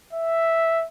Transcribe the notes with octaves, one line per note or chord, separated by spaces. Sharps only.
E5